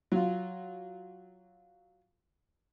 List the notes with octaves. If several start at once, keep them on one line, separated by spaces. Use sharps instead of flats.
F#3 F4